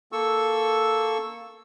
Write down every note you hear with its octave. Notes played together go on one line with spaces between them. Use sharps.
A#3 A4 C#6 E6